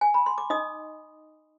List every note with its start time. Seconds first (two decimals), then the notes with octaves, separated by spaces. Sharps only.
0.01 G#5
0.14 B5
0.26 C6
0.38 D6
0.50 D#4 D#5 D#6